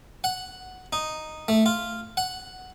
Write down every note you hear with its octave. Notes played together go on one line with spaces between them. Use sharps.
F#5
D#4
A3
F4
F#5